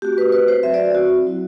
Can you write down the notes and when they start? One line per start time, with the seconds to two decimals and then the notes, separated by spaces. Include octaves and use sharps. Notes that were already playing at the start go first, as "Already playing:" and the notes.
0.02 A3 C4 F#4 G4
0.18 B4
0.32 B4
0.48 C5
0.63 F#3 C4 F#4 E5
0.74 D5
0.95 F#4
1.25 F#3 C4 E4